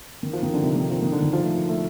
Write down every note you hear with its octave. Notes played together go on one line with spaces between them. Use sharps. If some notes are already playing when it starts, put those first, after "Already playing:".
D#3
F3
D#3
D3
C3
D#3
F3
D#3
D3
D#3
F3
A3
A3